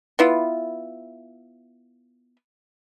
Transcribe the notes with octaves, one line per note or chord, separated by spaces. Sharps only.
B3 E4 F4